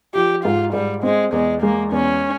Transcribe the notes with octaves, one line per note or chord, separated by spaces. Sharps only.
F3 G4
G#2 F4
G#2 G3
G#3 C4
E2 G#3
G#3 A#3
E2 C#4